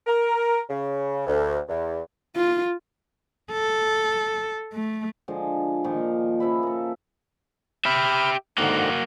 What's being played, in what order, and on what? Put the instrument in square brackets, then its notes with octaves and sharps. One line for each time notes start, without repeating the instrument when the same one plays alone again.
[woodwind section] A#4
C#3
D2
E2
[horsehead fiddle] F4
[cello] A4
A3
[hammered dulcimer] D3 F3 G#3 D4
A#2 D#3 F3
C#3 F3 E5 B5
A#3 A4
[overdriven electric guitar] G4 E5 [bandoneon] B5 F6
[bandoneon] G#2 D3 D#3 [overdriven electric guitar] A#3 F#4